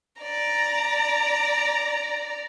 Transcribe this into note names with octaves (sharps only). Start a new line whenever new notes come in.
D5 A#5